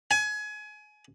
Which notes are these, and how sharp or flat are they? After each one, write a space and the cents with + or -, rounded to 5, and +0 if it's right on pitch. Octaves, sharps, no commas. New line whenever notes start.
G#5 +25